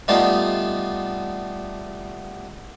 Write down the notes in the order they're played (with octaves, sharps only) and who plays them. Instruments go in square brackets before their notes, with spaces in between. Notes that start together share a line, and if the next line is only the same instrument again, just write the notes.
[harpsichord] G3 A3 B3 D#4 F4